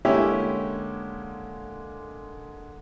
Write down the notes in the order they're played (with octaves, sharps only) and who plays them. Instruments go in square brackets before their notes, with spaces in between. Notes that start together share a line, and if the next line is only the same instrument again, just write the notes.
[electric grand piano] D3 G#3 A#3 [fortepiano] C#4 E4 G4